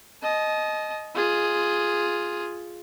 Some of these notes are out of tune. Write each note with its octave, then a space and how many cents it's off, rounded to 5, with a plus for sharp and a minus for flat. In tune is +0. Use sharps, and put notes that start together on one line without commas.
D#5 +0 A5 -35
F4 +0 G#4 +0